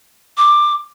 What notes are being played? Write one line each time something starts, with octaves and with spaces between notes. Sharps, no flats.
D6